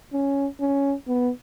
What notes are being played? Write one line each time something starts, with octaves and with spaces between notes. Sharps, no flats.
C#4
C#4
B3